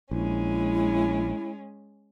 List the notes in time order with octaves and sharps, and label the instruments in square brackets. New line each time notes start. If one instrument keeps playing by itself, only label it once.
[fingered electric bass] A#1 [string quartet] G#3 C#4 [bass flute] E4